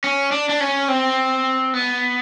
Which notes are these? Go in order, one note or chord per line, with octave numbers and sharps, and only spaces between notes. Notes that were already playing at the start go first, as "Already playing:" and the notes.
C#4
D4
D4
C#4
C4
B3